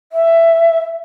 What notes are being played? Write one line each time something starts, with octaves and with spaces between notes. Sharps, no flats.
E5